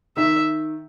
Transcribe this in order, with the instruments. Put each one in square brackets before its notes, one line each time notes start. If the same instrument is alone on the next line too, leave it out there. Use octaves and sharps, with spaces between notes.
[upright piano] D#3 [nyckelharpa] E5